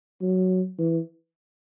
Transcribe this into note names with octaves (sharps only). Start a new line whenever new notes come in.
F#3
E3